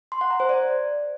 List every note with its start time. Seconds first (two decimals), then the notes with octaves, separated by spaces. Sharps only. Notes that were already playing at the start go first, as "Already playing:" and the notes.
0.12 C6
0.21 F#5
0.30 A#5
0.40 C5
0.49 D5